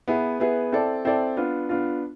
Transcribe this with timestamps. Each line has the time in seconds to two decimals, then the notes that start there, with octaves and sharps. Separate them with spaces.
0.08 B3 E4 G#4 B4
0.40 B3 E4 G#4 B4
0.72 C4 E4 A4 D5
1.05 C4 E4 A4 D5
1.37 B3 D4 F4
1.69 B3 D4 F4